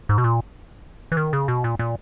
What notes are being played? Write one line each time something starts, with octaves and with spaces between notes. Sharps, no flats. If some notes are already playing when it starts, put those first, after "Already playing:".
G#2
B2
A#2
E3
D#3
C#3
B2
A#2
A#2